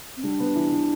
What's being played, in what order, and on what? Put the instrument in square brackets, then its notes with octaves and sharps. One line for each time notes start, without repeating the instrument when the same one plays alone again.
[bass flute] C4
[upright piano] G3 [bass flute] D4
[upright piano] B3
E3
E3